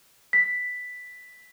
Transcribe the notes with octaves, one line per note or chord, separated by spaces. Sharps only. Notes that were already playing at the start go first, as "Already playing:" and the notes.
B6